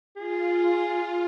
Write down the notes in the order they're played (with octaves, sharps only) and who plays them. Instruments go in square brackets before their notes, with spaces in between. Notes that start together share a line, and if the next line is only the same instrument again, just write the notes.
[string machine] F4 [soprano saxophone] G#4